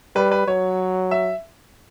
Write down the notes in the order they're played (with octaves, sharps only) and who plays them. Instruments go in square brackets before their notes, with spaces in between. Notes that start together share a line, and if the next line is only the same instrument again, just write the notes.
[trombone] G3 [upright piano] B4
[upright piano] B4
[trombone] F#3 [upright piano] C#5
[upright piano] E5